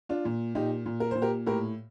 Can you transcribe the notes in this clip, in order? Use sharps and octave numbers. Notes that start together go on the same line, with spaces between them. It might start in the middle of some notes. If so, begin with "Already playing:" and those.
D4 F4
A#2
A#2 D#4 G4
A#2
A#4
A#2 C5
G4 A#4
A2 G4 A#4